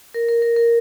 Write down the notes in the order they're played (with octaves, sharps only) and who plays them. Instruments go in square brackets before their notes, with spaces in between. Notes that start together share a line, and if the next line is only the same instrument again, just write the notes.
[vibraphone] A#4
A#4
A#4
A#4